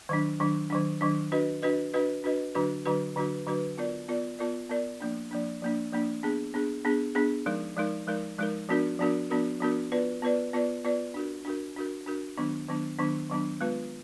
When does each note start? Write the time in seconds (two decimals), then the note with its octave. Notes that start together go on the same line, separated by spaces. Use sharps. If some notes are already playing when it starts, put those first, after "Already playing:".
0.09 D#3 F#3 D4
0.40 D#3 F#3 D4
0.70 D#3 F#3 D4
1.01 D#3 F#3 D4
1.32 D4 F#4 B4 D#5
1.62 D4 F#4 B4 D#5
1.94 D4 F#4 B4 D#5
2.24 D4 F#4 B4 D#5
2.55 D3 F#3 D4 F#4 B4
2.86 D3 F#3 D4 F#4 B4
3.16 D3 F#3 D4 F#4 B4
3.47 D3 F#3 D4 F#4 B4
3.78 B3 F4 A#4 D5
4.09 B3 F4 A#4 D5
4.39 B3 F4 A#4 D5
4.70 B3 F4 A#4 D5
5.00 F3 A#3 D4
5.31 F3 A#3 D4
5.62 F3 A#3 D4
5.92 F3 A#3 D4
6.23 B3 D4 G#4
6.54 B3 D4 G#4
6.85 B3 D4 G#4
7.15 B3 D4 G#4
7.46 F3 G#3 D#4 A#4
7.76 F3 G#3 D#4 A#4
8.07 F3 G#3 D#4 A#4
8.38 F3 G#3 D#4 A#4
8.69 F3 B3 D4 F#4 A#4
8.99 F3 B3 D4 F#4 A#4
9.30 F3 B3 D4 F#4 A#4
9.61 F3 B3 D4 F#4 A#4
9.92 B3 F4 B4 D5
10.22 B3 F4 B4 D5
10.53 B3 F4 B4 D5
10.84 B3 F4 B4 D5
11.14 D4 F#4 A#4
11.45 D4 F#4 A#4
11.76 D4 F#4 A#4
12.06 D4 F#4 A#4
12.37 D#3 F#3 B3 D4
12.68 D#3 F#3 B3 D4
12.99 D#3 F#3 B3 D4
13.29 D#3 F#3 B3 D4
13.61 G#3 B3 F4 B4